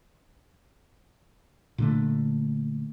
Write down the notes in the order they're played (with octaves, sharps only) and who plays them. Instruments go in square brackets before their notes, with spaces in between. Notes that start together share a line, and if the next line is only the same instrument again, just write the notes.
[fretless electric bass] A#2 D3 A3